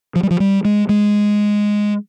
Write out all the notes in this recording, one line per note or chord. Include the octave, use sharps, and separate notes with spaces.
F3
G3
F3
G3
G#3
G#3